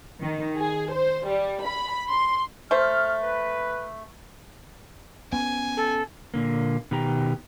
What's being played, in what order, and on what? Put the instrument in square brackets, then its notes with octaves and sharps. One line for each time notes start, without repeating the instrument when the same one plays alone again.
[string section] D#3
G#4
C5
G3
B5
C6
[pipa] A3 C5 [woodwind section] F6
[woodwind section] B4
[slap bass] B3 C#4 [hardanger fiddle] G#5
[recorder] A4
[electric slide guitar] A#2 D3 A#3
B2 D#3 G4 A#5